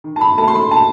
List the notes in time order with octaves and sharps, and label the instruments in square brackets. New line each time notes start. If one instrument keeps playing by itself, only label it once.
[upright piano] D#3
A5
B5
A3 A5
C6
B5
A5